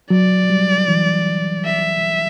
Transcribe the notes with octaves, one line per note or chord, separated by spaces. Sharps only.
F#3 D5
G3
E3
E5